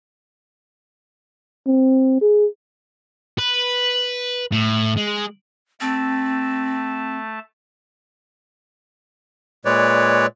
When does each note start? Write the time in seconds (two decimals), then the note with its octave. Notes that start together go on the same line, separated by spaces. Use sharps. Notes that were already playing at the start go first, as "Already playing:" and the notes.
1.67 C4
2.21 G#4
3.38 B4
4.52 A2
4.96 G#3
5.81 A3 C4 A5
9.65 A#2 G#3 B4 C#5 D5